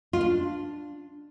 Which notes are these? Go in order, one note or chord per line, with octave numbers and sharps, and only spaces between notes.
F4
D4